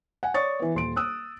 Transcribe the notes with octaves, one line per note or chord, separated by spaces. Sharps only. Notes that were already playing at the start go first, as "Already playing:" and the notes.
F#5 G#5
C#5 D5 C#6 D#6 A6
E3 B3
D#1 C6 D7
D#6 E6 F#6